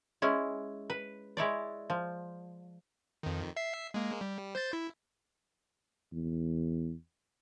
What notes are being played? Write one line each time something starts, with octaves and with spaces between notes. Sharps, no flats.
G#3 C#4 E4
B4
G#3 E4 C#5 D5
F3
F2 D#3
E5 C7
G#3 A#3
G3
C5 G6 A6
E4
E2